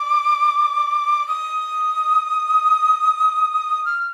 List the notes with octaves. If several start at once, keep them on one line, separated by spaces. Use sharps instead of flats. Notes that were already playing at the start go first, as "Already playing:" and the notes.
Already playing: D6
D#6
F6